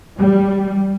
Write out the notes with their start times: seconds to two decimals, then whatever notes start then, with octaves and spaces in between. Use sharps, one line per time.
0.17 G3